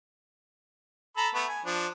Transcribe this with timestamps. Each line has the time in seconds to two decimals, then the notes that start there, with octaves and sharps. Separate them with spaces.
1.17 A4 A#5 B5
1.35 A3 B3 B4
1.48 G#5
1.65 F3 D4